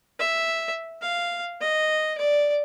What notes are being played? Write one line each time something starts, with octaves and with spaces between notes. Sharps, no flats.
E5
F5
D#5
D5